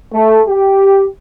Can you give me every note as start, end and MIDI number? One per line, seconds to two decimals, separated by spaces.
0.13 0.41 57
0.48 1.06 67